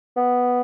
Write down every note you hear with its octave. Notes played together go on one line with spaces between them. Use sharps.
B3